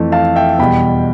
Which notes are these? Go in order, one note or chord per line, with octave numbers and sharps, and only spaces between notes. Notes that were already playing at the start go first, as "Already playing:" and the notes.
Already playing: F2 E3 A3
F5 A5
E5 G5
E2 B2 G3 G5 B5